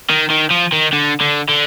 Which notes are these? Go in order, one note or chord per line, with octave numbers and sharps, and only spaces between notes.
D#3
D#3
F3
D#3
D3
D3
D3